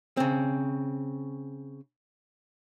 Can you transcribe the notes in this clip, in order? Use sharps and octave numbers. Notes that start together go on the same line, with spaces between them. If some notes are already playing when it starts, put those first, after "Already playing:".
C#3 C4